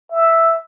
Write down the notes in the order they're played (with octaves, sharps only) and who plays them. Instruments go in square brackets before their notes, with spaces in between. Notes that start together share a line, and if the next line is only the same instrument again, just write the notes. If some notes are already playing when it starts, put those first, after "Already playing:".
[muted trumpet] E5